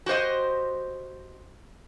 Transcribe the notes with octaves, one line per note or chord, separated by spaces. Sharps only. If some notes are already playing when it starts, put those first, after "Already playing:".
F#4 G4 C5 D#5